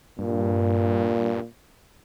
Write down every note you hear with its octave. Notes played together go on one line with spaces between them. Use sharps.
G2 A#2